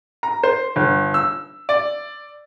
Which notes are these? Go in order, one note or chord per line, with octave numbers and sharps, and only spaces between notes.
A#5
C5
G1
E6
D5